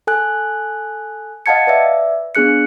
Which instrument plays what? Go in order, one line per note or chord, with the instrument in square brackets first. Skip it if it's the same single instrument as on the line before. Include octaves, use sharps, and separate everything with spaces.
[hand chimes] A4 G#5 F#6
D#5 F5 F#5 A5 G#6 C#7
B4 D5 E5
B3 D4 G#4 F#6 C#7